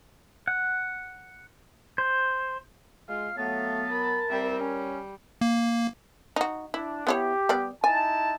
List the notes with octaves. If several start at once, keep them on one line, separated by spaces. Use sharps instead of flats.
F#5
C5
G#3 F4 F5
F#3 A3 B3 F5 A5
A#4 B5
C2 G3 C4 E5
C#4
A#3
D#4 F#4
D4 E4
B3 E4 G4 C#5
G3 B3 D5
D#4 E4 G#5 A5